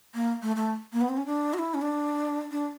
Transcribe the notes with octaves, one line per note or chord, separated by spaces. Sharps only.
A#3
A3
A3
A#3
B3
C4
C#4
D4
F#4
E4
C#4
D4
D4